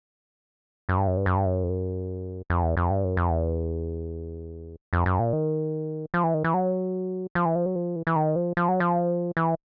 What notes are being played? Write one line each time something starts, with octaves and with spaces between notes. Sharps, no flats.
F#2
G2
F#2
G2
F#2
G2
F#2
F2
F#2
F2
E2
F2
G2
F#2
F2
E2
F2
F#2
A#2
D#3
F3
E3
D#3
E3
F#3
F3
E3
F3
F#3
F3
E3
E3
D#3
F3
F3
F#3
F3
E3